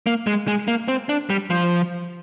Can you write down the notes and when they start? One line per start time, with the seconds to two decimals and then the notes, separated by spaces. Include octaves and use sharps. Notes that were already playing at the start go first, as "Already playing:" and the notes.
0.06 A#3
0.27 G#3
0.48 G#3
0.68 A#3
0.88 C4
1.09 D4
1.30 G3
1.50 F3